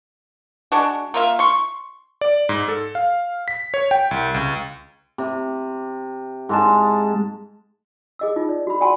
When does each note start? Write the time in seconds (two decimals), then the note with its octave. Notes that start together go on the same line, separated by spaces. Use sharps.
0.72 G#3 D4 F#4
1.14 A#3 F4 E5 F5
1.39 C6 C#6
2.21 D5
2.49 G#2
2.68 A4
2.95 F5
3.48 B6
3.74 C#5
3.91 G5
4.11 C2
4.34 C#2
5.18 C3
6.49 G#2 G#3 A5
8.19 G#4 D#5 E6
8.36 D#4 F4
8.49 D5
8.67 F#4 B5
8.81 D5 F#5 G#5 A5 B5 C6